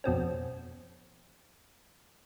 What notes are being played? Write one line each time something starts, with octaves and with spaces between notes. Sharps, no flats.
F2 B2 C4 C#4